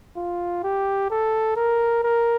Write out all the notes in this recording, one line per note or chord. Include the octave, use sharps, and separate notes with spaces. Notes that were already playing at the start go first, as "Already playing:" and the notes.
F4
G4
A4
A#4
A#4